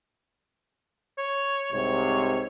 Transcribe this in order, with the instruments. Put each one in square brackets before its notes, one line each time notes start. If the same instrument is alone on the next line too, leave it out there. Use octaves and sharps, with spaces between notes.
[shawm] C#5
[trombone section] C2 G#2 C3 [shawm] C#5